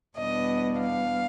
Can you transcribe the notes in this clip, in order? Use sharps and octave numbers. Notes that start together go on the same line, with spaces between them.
E2 B2 G3 B3 D4 D#5
F5